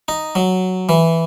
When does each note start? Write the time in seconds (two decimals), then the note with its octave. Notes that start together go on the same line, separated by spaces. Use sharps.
0.08 D#4
0.35 F#3
0.89 E3